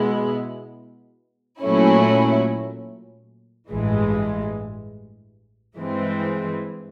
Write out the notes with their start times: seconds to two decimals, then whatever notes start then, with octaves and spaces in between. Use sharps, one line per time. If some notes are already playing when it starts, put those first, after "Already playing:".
Already playing: B2 G#3 B3 E4
1.62 A#2 F#3 A3 C#4 E4
3.69 A1 G2 E3 G#3
5.75 G2 E3 G#3 C4